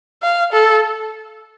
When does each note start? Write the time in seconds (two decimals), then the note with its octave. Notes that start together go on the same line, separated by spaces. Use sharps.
0.23 F5
0.53 A4